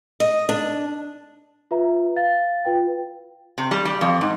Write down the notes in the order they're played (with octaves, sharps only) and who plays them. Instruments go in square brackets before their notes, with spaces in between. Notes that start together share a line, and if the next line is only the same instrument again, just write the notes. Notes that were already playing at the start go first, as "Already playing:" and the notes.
[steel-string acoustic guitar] D#5
D4
[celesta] F4 B4 E5 A#5
F5 A6
F4 B4 G5
[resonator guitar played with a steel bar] C3
G3
G3
F2
G#2